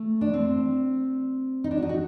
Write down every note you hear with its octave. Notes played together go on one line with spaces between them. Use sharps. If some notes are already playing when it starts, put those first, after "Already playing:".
Already playing: A3
D4
C4
D#4
D4
F#4
D#4
F#4